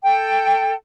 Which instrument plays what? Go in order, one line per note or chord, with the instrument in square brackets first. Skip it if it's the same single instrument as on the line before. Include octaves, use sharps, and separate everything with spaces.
[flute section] A4 G5